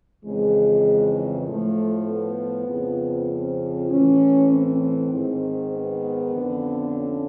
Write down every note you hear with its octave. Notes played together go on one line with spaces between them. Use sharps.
F2 C#3 E3 G#3
A2 F3 A3
B3
F2 C#3 F3
C4
A2 E3 C#4
C4
G#2 D#3
B3
F2 D3 F3
C#4